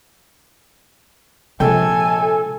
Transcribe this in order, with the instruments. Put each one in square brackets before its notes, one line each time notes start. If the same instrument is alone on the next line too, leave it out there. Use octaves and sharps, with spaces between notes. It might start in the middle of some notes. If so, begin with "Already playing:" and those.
[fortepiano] A#1 G5 [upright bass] C3 G#3 [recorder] A4 [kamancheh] G#5